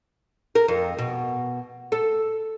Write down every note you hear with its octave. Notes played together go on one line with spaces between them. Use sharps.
A#4
F2
B2
A4